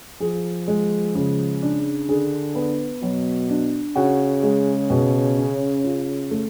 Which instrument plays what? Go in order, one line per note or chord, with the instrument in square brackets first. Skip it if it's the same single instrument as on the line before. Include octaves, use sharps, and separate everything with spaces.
[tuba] F3 [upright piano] G#4
[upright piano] G#3
C#3
D4
[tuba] D3 [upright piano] G#4
[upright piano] B3
[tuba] B2 [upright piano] F#3
[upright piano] D4
[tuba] C#3 [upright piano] F#4
[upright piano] G#3
B2
C#4
F4
A3